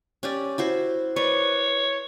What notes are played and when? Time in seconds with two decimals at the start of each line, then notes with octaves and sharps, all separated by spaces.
0.23 C#4 G4 D5
0.58 E4 F#4 C5
1.16 B4 C#5 D5